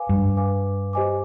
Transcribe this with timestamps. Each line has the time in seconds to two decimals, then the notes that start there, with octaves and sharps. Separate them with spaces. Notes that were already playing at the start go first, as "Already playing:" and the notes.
Already playing: B4 F5 G#5 D6
0.09 G2
0.37 B4 F5 G#5 D6
0.93 G4 C5 D#5 G#5 D6